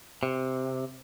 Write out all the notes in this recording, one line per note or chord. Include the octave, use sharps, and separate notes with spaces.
C3